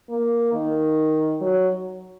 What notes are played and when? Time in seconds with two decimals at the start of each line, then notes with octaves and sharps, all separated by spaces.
0.10 A#3
0.54 D#3
1.41 F#3